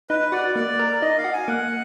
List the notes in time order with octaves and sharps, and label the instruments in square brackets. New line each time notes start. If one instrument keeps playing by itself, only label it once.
[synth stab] D#4 [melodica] B4
[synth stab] F#4 [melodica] D5
[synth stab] A#3 [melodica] D5
[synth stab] A#4
[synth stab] D#4 [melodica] D#5
[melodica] F5
[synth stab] F#4
[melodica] G#5
[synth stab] A#3 [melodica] F#5